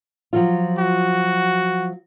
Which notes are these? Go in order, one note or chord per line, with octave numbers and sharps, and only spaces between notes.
F3 F#3 F4
F#4